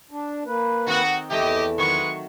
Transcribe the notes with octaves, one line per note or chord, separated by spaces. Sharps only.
D4
A#3 B4
D#3 C4 D#4 F#4
E2 E3 A3 E4 G4 D#5
D#3 F#3 G#3 B4 C#6